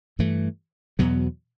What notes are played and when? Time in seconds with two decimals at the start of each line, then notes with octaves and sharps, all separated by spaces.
0.19 G2 E3 A3
0.99 E2 B2 F#3 B3